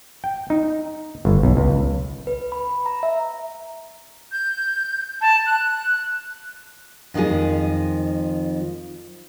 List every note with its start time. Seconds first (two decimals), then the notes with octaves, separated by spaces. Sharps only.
0.24 G5
0.50 D#4
1.25 G1
1.43 B1
1.57 C#2
2.27 B4
2.52 B5
2.86 A#5
3.03 E5
4.32 G6
5.21 A5
5.46 F#6
7.14 F2 D#3 F3 G#3 G#4